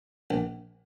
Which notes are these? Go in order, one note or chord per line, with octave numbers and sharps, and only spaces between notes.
A#1